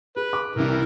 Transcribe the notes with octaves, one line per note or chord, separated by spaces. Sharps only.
G#4 B4
D6
C2 C3 E3 G3 A#4